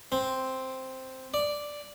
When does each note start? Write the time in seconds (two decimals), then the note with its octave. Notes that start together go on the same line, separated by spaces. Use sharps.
0.12 C4
1.34 D5